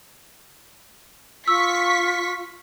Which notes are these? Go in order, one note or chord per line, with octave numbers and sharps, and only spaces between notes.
F4 C#6 E6 B6